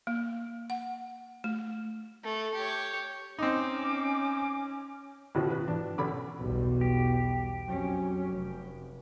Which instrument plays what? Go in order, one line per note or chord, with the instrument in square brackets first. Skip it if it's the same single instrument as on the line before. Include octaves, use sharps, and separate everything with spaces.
[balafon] A#3
F#5
A3
[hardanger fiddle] A3
G4 C#5
[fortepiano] C4 D#4 [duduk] C#4 [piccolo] D6
[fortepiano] A1 B2 F3 [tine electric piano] D#3 G4
[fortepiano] B4
[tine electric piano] G#2 E3 [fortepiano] D4
[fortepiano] B1 B5 D6 [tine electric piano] C#4 D4 A4
[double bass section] B1 E2 G3 [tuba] B2
[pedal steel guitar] G4
[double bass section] F2 C#4 [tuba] F#3
[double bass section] F1